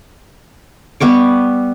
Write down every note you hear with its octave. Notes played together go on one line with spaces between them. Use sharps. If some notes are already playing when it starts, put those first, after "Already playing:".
G3 B3 C#6 D6